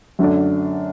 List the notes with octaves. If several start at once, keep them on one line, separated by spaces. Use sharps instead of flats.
F#2 D3 A3 D4